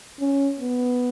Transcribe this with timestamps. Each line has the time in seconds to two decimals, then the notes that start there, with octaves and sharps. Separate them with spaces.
0.20 C#4
0.60 B3